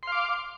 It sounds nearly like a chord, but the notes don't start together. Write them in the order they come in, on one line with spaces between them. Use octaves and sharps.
C6 F5 D6